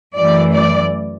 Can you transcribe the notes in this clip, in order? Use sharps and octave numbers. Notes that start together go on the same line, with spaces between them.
F#2 E3 A3 D5
D5